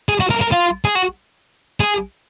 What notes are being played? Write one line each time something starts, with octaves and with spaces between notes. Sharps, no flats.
G#4
F#4
A#4
A#4
F4
G#4
F#4
G#4